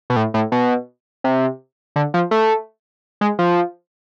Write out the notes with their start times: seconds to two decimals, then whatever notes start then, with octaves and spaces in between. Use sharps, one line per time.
0.10 B2
0.16 A2
0.34 A2
0.52 B2
1.24 C3
1.96 D3
2.14 F3
2.31 A3
3.21 G#3
3.39 F3